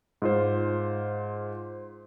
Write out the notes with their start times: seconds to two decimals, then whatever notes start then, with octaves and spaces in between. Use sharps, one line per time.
0.22 G#2 F4 C5